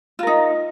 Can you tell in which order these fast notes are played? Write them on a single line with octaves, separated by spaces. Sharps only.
F4 A#4 D#4